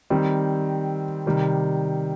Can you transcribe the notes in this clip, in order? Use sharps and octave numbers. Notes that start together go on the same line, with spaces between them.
D#3 G3 C4
C3 D#3 G3